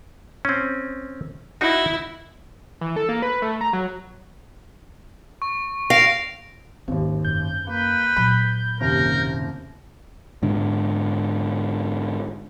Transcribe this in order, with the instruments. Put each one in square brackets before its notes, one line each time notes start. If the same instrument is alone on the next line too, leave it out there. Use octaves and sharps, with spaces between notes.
[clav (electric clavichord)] C4 C#4
[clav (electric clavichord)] D#4 F#4 [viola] E4
[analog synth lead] E3
A4
A#3
B4
A3
A#5
F#3
[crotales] C#6
[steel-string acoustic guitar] F5 [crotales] A#6 D7 F7
[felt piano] G#1 D#2 [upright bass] C#4
[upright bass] F#2 [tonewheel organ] G6
[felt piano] A#3 [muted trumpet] B4
[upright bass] A#2 F#3 [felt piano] B5
[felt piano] F#1 D#2 C3 [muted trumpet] A#4
[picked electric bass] G#2 D3